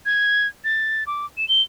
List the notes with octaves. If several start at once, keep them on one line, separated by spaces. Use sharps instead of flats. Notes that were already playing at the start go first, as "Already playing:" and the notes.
G#6
A6
D6
E7
G7